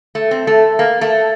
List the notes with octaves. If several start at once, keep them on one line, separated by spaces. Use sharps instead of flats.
A3
C4
A3
A#3
A3